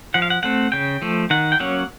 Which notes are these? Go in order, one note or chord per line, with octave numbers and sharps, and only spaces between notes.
F3 F#5
F5
F#5
A3 C4 F#5
C#3 G5
F3 A3
D#3 F#5
G5
F#3 A#3 C#4 F#5